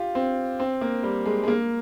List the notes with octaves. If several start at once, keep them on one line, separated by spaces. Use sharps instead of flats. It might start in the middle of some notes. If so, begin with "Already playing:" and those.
Already playing: F4 G4
C4
C4
A#3
G3
G#3
G#3
A#3